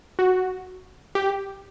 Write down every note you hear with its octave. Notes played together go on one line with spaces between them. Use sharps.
F#4
G4